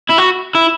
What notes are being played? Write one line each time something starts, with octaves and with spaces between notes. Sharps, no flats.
E4
F#4
E4